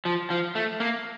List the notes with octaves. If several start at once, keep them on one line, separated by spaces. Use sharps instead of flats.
F3
F3
A3
A#3